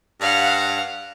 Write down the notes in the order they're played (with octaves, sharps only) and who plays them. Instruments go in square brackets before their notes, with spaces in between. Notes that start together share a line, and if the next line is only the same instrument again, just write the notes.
[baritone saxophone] G2 [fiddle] F5 F#5